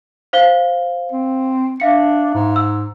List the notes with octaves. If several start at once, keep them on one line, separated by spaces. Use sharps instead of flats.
C5 F5 G7
C4
D4 E5 F5 C#7
G#2
E6